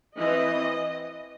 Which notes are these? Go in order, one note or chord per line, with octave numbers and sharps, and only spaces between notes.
E3 C4 D#5